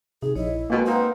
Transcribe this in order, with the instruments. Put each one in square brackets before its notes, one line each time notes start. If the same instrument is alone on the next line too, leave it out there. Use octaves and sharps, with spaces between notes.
[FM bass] C3 [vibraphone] D#4 [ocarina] G#4
[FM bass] A#1 [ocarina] E4 [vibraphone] C#5 D#5
[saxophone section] F2 B2 [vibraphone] G#3 G5 [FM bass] A#3
[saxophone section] C4 D#4 A#4 [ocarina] B4 [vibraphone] F5 F#5 A#5